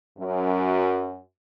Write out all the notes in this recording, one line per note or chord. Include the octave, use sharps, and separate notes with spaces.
F#2